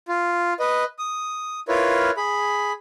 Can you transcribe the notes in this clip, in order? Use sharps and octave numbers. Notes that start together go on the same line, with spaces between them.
F4
B4 D#5
D#6
E4 F4 A#4 B4 C#5
G#4 B5